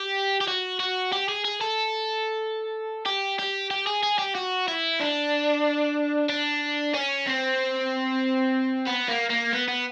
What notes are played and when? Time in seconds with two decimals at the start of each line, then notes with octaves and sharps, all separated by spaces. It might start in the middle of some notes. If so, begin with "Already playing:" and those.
Already playing: G4
0.41 G4
0.48 F#4
0.80 F#4
1.13 G4
1.29 G#4
1.45 G#4
1.61 A4
3.06 G4
3.39 G4
3.71 G4
3.87 G#4
4.03 G#4
4.19 G4
4.35 F#4
4.68 E4
5.00 D4
6.30 D4
6.94 C#4
7.26 C4
8.87 B3
9.09 A#3
9.30 A#3
9.53 B3
9.68 B3